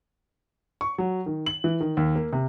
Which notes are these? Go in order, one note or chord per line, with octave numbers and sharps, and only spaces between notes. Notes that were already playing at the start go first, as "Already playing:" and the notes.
C#6
F#3
D#3
F#7
E3
D#3
D#2
A#3
C3